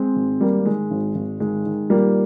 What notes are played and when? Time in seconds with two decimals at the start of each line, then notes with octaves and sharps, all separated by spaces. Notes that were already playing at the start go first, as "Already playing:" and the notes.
Already playing: G#3 C4
0.16 G#1
0.41 G#2 G3 A#3
0.66 D#3 G#3
0.91 G#1
1.15 G#1
1.40 D#3 G#3
1.66 D#3
1.90 A#2 G3 A#3